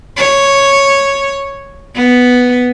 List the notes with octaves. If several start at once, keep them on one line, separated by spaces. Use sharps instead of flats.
C#5
B3